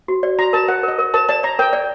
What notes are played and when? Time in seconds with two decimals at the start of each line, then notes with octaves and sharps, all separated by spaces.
0.08 F#4
0.23 D5
0.39 F#4 A#5
0.53 A#4 A5
0.68 A#4 F#5
0.83 A#4
0.88 D#5
0.99 A#4
1.14 A#4 A5
1.29 D5 A5
1.43 D5 A#5
1.59 A#4 G5
1.73 D5